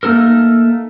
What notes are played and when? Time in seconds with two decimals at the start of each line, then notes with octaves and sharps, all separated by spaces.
0.03 A3 A#3 D#4 A4 A#4